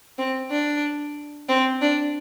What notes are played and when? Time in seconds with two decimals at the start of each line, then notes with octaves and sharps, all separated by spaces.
0.18 C4
0.51 D4
1.49 C4
1.81 D4